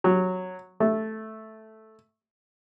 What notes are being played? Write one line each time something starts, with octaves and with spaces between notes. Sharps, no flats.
F#3
A3